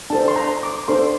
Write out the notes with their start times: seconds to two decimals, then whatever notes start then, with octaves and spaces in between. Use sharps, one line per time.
0.10 D4 A4 C5 A5
0.28 C6
0.36 A#5
0.63 D6
0.88 D4 A4 C5 C6